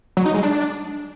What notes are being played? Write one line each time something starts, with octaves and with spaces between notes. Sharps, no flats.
F#3
D#4
G#3
D4